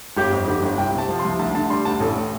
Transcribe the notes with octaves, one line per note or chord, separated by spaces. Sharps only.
G1 G4
F2
D3 G4
G1
C2 G5
C3 A5
F3
C6
C2
D2 A5
D3 A5
G3 C6
D2 A5
A1 A4
A2